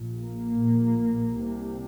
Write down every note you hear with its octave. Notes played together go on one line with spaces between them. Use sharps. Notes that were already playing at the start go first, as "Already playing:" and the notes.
Already playing: A#1 A#2
A#3
A#1 A#2
C2 C3